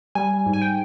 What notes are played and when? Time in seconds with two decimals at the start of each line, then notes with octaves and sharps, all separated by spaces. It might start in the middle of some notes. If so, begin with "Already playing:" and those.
0.15 G3 G#5
0.46 G#2
0.53 G#5
0.62 G5